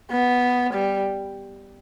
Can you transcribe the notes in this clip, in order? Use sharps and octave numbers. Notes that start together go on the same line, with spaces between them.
B3
G3